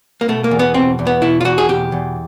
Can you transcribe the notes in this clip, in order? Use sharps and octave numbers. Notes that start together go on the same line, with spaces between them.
A#3
B2 A3
A#3
E2
B3
B2 C4
E2
B3
B2 E4
F4
E2 F#4
G#4
B2 G4
E2